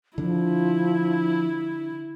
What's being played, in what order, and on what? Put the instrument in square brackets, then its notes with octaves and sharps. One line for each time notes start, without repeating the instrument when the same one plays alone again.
[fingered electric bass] D3 D4 [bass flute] F3 [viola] E4